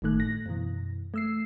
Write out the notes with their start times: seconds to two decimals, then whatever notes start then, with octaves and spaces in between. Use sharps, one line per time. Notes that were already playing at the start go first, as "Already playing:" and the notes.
0.02 G1 A2 D#3 A3 F#6
0.19 A2 A#6
0.46 F#2 B2 E3
1.14 A3 E6 C7